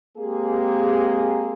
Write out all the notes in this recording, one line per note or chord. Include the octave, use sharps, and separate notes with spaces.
G#3 A#3 C4 G4 G#4